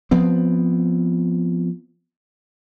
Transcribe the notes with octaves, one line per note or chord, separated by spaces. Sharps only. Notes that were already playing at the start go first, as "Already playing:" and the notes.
F3 B3 C4